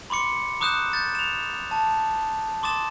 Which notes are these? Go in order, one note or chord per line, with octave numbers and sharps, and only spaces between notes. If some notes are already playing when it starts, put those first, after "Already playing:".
B5 C6 D6 C#7
A#5 D6 D#6 F#6 G6 E7
G6 A6
E7 F7
A5
C6 D6 D#6 A6 E7